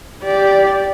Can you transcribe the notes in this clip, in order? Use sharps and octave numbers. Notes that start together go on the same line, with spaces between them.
G4 D5